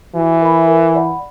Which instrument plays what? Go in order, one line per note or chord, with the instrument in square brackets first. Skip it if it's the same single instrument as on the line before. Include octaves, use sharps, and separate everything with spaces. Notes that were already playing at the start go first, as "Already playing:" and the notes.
[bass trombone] E3 [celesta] F#4
[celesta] A#4 E5 B5
A#4
D5 F#5 B5